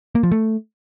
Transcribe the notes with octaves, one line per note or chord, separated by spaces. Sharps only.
A#3
F3
A3